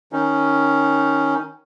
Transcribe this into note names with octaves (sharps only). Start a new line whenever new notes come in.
D#3 C#4 D#4